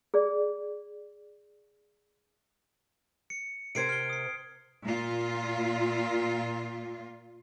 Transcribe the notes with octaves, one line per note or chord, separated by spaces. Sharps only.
G#4 D5
C#7
C3 A#4 C5 G#6 C7 D7
F6 G7
D#6 C7
A#2 F4